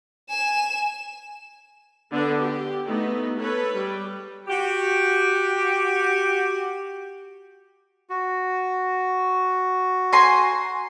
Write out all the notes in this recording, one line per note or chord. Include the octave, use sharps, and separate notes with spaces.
G#5 E7
D3 B3 D4
G4
A3 B3 D#4
A4 B4 C#5
G3
F#4 G4
F#4
G#5 A#5 C6